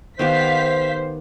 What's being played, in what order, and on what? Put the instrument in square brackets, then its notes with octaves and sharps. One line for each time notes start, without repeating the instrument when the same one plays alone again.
[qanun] D#3 B3 G4 [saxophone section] C5 [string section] F5 B6